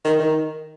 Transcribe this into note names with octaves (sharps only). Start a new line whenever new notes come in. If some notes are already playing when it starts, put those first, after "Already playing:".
D#3
D#3